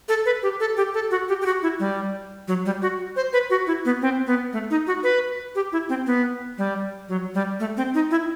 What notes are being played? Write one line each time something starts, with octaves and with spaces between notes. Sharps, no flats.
A4
B4
G4
A4
G4
A4
F#4
G4
G4
F#4
E4
G3
F#3
G3
F#4
C5
B4
F#4
E4
B3
C4
B3
A3
D#4
F#4
B4
G4
E4
C4
B3
G3
F#3
G3
A3
C4
D#4
E4